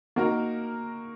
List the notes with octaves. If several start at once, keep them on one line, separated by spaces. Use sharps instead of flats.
A#3 D#4 F#4 A#4